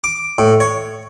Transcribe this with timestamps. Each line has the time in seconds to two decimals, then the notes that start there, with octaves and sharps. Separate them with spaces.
0.04 D6
0.38 A2
0.60 C#5